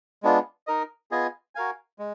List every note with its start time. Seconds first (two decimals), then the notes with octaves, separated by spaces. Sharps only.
0.23 G#3 B3 D4 F4
0.67 D#4 A#4 D#5
1.11 B3 F4 G#4 D#5 G#5
1.55 F#4 A#4 F5 G#5
1.99 G#3